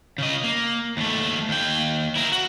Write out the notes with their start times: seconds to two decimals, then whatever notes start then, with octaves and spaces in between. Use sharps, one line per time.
0.18 C#3 D#5
0.44 A#3
0.97 D#2 A3
1.49 D#2 G5
2.16 E4 A#4
2.32 F#4